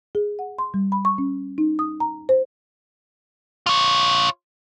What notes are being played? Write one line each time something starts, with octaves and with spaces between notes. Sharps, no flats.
G#4
F#5
C6
G3
B5
C#6
C#4
D#4
D#6
A#5
C5
F4 C#5